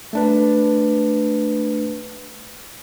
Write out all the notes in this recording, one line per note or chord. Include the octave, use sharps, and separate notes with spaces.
A3 D4 B4